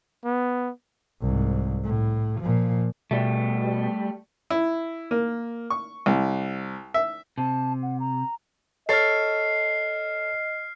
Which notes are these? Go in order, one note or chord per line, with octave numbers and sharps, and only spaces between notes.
B3
C2 G#2
A2
A#2 F3
B2 G3 A3
E4
A#3
C#6
C2
E5
C3 A5
F#5
A#5
A4 C#5 D#5 F6 A6 C7